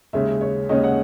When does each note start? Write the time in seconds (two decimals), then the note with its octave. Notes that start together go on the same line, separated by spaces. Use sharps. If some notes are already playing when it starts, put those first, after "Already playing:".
0.13 D#2 C#3 G#3 C#4 E5
0.41 C#5
0.69 D#2 C#3 G#3 C#4 D#5
0.84 F#5